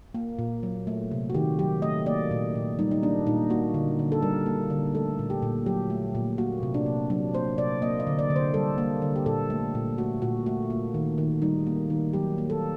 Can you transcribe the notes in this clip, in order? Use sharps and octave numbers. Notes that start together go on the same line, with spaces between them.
A#3
A#2
F#3
A3
C3
F#4
D#3 G4
F#3 G4
A3 D#5
A#3 D5
A#2
A#2
G3 D#4
D#4
A#3 D4
A#2 D#4
A#3 F#4
D3
D3
A4
G3 A#4
A#3
D3
A3 A4
A#2
G4
A#2
F#3 G4
A3
A#2
A#3 F#4
C3
D4
C3
F#3 D4
A#3 C5
C3 D5
A#3 D#5
D#5
D3
D5
D3
C5
G3 A4
A#3
D3
G4
A#2 A4
A3
A#2
A3 F#4
A#2 F#4
A3 F#4
A#3
D#3
D#3
G3 D#4
A#3
D#3
F#3 G4
A#3
A4